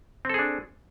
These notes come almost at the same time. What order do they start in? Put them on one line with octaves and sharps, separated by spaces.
C4 A4 G#4 D4